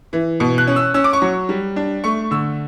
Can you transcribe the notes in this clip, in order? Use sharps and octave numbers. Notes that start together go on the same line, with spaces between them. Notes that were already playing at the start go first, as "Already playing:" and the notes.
E3
B2
F#6
C#4
E6
C#4 E6
D6
C#6
F#3
G3
D4
A3 C#6
D3 E6